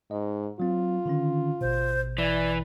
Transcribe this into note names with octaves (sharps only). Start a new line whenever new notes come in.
G#2 D#5
F#3 C4 F4
D3 D#3 C#4
A1 B2 C5
E3 D5